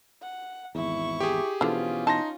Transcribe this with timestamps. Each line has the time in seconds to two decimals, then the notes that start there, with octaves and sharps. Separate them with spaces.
0.22 F#5
0.75 G#1 E2 E4 C#6
1.20 G4 G#4
1.61 B2 D3 E3 F3 B3 C#4 F4
2.07 D#4 A5 C6 A#6